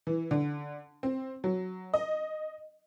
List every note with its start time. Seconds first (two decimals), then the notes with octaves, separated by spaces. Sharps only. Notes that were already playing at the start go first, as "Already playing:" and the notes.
0.07 E3
0.31 D3
1.03 C4
1.44 F#3
1.94 D#5